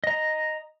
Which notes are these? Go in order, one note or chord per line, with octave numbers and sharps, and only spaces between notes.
D#5 A#5